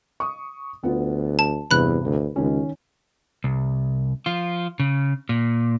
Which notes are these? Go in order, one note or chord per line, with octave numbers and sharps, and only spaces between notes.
C#6 D#6
D2 B3 F4
A5
E2 G2 C3 B5 F#6
D2
C#2 D#3 C#4
C2
F3 F4
C#3
A#2